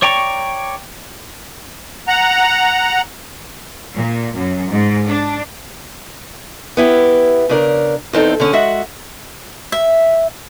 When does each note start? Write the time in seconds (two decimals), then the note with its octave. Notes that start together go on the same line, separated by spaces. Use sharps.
0.02 C#5 D5 G5 A#5 C#6
2.08 F#5 A#5
3.94 A#2
4.34 F#2
4.69 G#2
5.06 D4
6.77 B3 E4 G4
7.49 C#3 D4 A#4
8.13 E2 C4 D#4 A4
8.40 D3 C#4 G#4
8.53 G#3 F#4 E5 F#5
9.72 E5